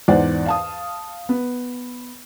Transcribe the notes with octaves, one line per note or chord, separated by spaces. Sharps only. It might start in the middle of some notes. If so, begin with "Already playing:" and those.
E2 G#2 C5 D5 F#5
F5 A5 D#6
B3